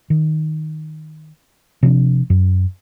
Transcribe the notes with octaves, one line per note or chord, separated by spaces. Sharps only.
D#3
C3 F3 C#4 D4
F#2